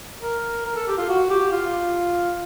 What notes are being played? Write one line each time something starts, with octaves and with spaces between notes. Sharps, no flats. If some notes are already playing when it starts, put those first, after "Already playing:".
A#4
A#4
A4
G4
F4
F#4
G4
F4